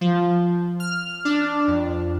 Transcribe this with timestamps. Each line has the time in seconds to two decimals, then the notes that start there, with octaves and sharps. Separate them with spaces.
0.01 F3
0.80 F6
1.25 D4
1.68 F2